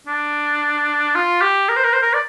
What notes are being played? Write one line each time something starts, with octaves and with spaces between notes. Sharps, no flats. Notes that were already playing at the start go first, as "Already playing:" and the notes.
D4
F4
G4
A#4
C5
A#4
C5
A#4
D5